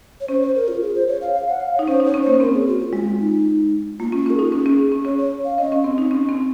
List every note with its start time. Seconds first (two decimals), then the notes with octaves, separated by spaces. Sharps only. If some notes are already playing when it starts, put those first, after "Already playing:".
0.21 C#5
0.28 C#4 C5
0.42 C5
0.55 A#4
0.68 F4
0.82 G#4
0.95 C5
1.08 C#5
1.21 F5
1.34 F5
1.48 F#5
1.60 F5
1.74 C#5
1.79 D#4
1.87 C#4 C5
2.00 D#4 C#5
2.14 C#4
2.23 A#3 C5
2.34 C#4
2.40 C4 A#4
2.54 G#4
2.67 F#4
2.80 F4
2.93 G#3 F4
3.20 D#4
3.99 A#3 F4
4.12 C#4 F4
4.26 C#4 A#4
4.35 D#4 G#4
4.52 C#4
4.66 C#4
4.92 C#4
5.05 C#4 C#5
5.18 C#5
5.45 F5
5.58 C#4 D#5
5.72 C#4
5.84 C4
5.98 D#4
6.11 C#4
6.29 C4